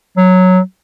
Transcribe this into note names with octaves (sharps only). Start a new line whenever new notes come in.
F#3